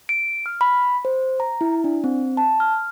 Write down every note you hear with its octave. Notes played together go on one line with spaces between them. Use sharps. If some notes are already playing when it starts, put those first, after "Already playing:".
D7
F6
B5
C5
A#5
E4
D4
C4
A5
F6